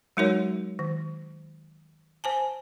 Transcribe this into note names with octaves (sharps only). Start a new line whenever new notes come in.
F#3 G#3 D#4 F#4 A#4 C#5
D#3
C5 G#5 A5